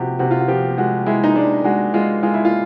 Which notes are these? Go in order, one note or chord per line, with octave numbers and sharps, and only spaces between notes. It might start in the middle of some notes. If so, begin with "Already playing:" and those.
Already playing: C3 F3 F#4 G4
C3 F#4
F4
F#4
F3 G4
G#3 F#4
G#3 E4
D#4
G#3 D4
G#3 F#4
G#3 F4
G#3 F4
E4
F4